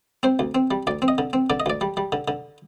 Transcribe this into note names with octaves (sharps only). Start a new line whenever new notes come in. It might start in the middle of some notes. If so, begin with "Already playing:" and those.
C4 C5
D2
C4
G3
D2 D5
C4
D#5
D3
C4
D3 D5
D#5
D2 D5
G3
G3
D3
D3